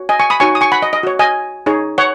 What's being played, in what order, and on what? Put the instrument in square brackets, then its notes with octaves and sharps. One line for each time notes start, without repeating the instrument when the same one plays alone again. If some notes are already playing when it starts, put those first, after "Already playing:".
Already playing: [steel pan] F#4 C#5
D#5 G#5
G#5 C#6
B5 D#6
D#4 F#4 C#5 G#5 C#6
D#6
G#5 C#6
F#5 B5
D#5
D#5
F#4 C#5
D#5 G#5
D#4 G#4 C#5
C#5 F#5